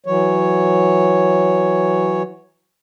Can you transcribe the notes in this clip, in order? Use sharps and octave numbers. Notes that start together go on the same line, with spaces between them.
E3 F#3 C#5